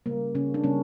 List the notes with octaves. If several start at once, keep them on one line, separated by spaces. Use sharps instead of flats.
C#3 G3 A#3
C#3 C#4
D4
C#3 G3 A#3 C#4